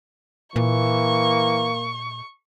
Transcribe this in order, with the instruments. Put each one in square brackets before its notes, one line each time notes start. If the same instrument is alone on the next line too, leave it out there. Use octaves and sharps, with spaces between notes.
[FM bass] A#2 [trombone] E3 [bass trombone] A#3 [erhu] C#6